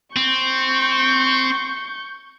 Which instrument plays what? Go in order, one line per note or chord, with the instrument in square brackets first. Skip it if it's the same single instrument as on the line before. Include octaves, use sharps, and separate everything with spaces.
[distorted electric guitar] C4 [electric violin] C#6 G6